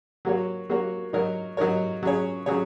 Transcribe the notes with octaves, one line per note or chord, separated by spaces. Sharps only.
F#3 A#3 F#4 C#5
F#3 A#3 F#4 C#5
F#3 D#4 A#4 C#5
F#3 D#4 A#4 C#5
F#3 C#4 G#4 C#5
F#3 C#4 G#4 C#5